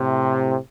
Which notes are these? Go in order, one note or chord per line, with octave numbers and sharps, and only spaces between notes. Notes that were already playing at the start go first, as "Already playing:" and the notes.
Already playing: A2 C3